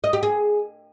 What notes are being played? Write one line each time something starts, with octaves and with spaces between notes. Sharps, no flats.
D#5
G4
G#4